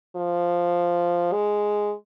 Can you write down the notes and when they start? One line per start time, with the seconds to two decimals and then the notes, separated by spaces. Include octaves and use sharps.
0.16 F3
1.33 G#3